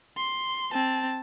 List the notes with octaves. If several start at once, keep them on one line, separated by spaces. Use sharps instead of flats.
C6
C4 A5